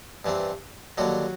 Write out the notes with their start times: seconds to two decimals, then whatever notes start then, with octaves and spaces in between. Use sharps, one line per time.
0.25 G2 E3 G3 C4
0.98 D#2 D3 F#3 G3 F#4